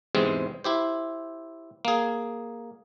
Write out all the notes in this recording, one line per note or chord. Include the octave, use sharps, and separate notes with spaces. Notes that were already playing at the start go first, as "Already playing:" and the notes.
E2 G#2 C3 G#3 C4
E4 G4 C5
A#3 G#4